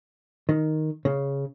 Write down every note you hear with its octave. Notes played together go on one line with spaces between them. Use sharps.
D#3
C#3